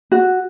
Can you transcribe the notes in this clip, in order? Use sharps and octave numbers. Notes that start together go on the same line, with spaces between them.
F#4